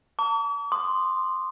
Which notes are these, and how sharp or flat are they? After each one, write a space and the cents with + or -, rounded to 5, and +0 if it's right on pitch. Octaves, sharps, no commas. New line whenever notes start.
A5 +45 D6 -45
C6 +0 D#6 -30